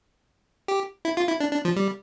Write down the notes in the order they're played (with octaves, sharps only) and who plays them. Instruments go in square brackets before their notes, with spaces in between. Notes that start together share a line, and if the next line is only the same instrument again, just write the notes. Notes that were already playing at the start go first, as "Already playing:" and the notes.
[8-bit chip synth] G4
E4
F4
E4
D4
D4
F3
G3